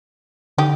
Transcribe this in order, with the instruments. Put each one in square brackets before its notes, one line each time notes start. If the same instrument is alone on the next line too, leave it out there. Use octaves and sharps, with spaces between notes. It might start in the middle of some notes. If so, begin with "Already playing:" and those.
[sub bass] D3 [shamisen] D#4 G4